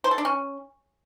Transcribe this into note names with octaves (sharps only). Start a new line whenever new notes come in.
C5
A4
D4
C#4